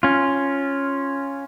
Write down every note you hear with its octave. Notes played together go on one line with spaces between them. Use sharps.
C#4 F4